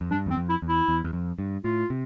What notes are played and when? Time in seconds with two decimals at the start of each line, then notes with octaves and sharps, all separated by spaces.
0.01 F2
0.11 G2 D4
0.26 E2 C4
0.37 F2
0.49 E4
0.62 E2
0.69 E4
0.88 E2
1.04 E2
1.13 F2
1.39 G2
1.64 A2 F4
1.90 C3